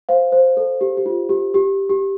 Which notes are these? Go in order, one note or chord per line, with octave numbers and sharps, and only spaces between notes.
C5 F5
C5
A4
G4
G4
F4
G4
G4
G4